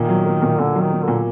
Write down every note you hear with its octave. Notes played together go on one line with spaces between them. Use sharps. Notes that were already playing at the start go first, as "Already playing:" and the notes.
Already playing: A#2 D#3
F#3
A#3
A#2
A#2 D3
F#3
D#3
A#3
A#2 D3